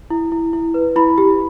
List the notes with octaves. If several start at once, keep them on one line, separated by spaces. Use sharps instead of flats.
E4
E4
E4
B4
E4 B5
G4